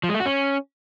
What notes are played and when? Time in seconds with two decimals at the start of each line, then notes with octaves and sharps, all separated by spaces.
0.03 F3
0.09 G#3
0.15 A3
0.20 F#4
0.26 C#4